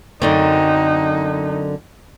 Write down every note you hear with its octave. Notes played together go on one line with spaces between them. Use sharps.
F#2 D3 C4 D#4